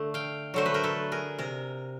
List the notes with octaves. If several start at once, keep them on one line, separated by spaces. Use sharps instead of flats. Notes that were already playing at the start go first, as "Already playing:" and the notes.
Already playing: D3 A3
F5 G5
D3 F#3 A3 C5
B4
A#4 C5
A4 B4
G#4 A#4
C3 A#4